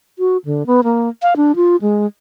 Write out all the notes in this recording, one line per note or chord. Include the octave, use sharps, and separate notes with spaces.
F#4
D3
B3
A#3
F5
D4
F4
G#3